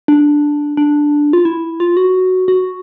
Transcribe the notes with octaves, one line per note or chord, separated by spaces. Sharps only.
D4
D4
F4
E4
F4
F#4
F#4